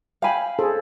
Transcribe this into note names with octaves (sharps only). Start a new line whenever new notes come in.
F5 G5 G#5 B5
G#4 A4 C5